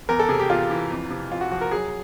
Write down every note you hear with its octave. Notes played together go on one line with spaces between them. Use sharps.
E2 A#4
A4
C3 G#4
G4
E2 F4
E3
F2
C3
F2 F4
F#4
F3 F#4
A#4
F#3 G#4